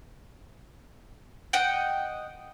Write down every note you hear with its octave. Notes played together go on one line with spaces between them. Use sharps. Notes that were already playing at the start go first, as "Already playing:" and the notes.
D#5 F#5 G5